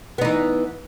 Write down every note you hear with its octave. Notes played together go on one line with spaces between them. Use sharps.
E3 B3 D#4